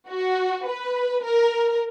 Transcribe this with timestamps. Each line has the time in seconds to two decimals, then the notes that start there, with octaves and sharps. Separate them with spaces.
0.10 F#4
0.68 B4
1.24 A#4